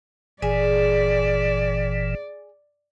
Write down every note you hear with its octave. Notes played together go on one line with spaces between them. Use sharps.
G1 A#2 E3 G#4 D5